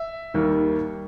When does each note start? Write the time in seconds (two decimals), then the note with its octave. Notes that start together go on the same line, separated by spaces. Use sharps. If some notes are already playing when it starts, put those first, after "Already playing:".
Already playing: E5
0.34 D#2 D#3 G3 A#3